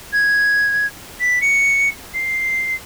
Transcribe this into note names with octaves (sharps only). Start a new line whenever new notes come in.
G#6
B6
C#7
C7